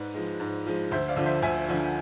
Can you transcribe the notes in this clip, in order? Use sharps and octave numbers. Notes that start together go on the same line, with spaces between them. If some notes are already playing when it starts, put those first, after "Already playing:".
Already playing: G#2 B4 D5
F3 G#3
G#2
F3 G#3
D2 C5 E5
D5 F5
D3 F3
C5 E5
D2 E5 G#5
D3 F3